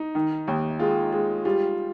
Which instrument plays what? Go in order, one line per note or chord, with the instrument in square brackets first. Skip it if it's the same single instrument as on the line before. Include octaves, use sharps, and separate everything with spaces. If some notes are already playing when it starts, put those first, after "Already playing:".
Already playing: [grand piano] D#4
[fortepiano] D#3
D#2
[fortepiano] G#3 [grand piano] F4
[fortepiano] G#3
[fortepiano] G3 [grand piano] F4